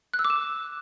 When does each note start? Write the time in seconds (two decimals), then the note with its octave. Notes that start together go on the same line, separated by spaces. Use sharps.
0.14 F#6
0.19 E6
0.25 D6
0.30 E7